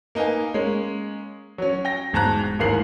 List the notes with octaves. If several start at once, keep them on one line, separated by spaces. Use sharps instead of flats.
A#3 D#4 B4 F5 G#5
G#3 A#3 C#4
F#3 C#4
G5 A#6
E1 G#2 A5 A#5 F#6
A1 D#2 G#2 A#4 C7 F#7